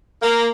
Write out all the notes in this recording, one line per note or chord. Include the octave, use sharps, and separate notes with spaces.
A#3